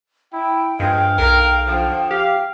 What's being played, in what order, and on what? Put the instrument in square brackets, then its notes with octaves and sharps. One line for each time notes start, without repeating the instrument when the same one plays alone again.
[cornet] E4 [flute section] G5
[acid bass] G2 [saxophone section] F3 G#3 [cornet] F5
[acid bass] B1 [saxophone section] A#4
[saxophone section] D3 F3
[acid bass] G4 [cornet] F5